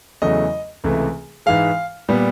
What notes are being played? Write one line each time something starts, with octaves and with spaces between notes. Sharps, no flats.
E2 C#3 F#3 A3 D#5
C#2 C3 E3 A3
G#2 E3 G#3 F5
A#2 G3 B3